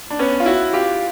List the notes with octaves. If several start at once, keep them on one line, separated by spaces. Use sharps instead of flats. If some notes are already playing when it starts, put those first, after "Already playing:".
D4
B3 C#4
F4
E4 F#4
F4 G4